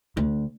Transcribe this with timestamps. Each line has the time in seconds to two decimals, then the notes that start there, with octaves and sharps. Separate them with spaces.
0.17 D2